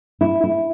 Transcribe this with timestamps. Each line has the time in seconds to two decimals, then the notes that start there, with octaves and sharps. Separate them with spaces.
0.21 E4
0.44 E4